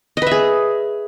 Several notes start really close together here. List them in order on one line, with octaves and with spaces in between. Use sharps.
D#5 B4 E5 G#4